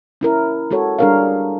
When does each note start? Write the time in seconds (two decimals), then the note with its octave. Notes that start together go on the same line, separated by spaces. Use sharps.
0.21 C#4 E4 A#4
0.71 G#3 F#4 A4 C#5
0.99 G3 D4 G#4 A#4 C#5 F5